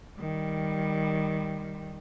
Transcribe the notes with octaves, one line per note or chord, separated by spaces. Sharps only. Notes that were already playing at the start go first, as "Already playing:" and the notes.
D#3 G3